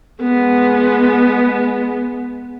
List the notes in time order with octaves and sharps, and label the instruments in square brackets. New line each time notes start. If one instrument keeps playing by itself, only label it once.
[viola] G#3 B3